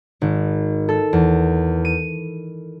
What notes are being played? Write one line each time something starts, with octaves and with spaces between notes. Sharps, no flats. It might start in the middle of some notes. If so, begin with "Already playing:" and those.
G#1
A4
E2
D#7